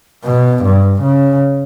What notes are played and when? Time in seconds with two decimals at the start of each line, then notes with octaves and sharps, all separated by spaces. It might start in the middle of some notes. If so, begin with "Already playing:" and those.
0.24 B2
0.64 G2
1.02 C#3